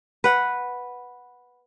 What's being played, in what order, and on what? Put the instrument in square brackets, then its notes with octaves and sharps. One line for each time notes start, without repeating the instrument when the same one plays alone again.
[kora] B4 F#5